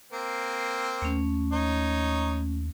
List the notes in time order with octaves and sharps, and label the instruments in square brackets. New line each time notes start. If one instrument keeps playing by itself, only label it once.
[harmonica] A#3 C4
[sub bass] D#2 [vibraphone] A3 C#4
[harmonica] D#4 C#5